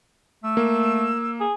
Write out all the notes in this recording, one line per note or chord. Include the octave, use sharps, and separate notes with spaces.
A3 E6
A#3
G#4